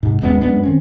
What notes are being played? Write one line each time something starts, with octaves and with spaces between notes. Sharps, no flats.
G#2 C3
D#1 F#2 G#3 B3
F#2 G#3 B3 D4
D#3 C4 C#4